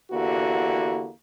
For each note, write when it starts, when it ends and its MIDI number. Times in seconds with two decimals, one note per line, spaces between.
0.11 1.10 40
0.11 1.10 50
0.11 1.10 58
0.11 1.10 64
0.11 1.10 66
0.11 1.10 67